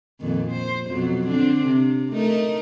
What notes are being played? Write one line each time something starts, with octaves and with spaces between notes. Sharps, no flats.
F2 A#2 D#3
C5
F2 B2 F#3
D3 C4 D4
C3
A3 D#4 A#4